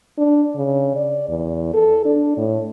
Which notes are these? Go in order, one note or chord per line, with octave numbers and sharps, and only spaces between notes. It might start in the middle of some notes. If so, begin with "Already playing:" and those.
D4
C#3
D5
E2
A4
D4
A2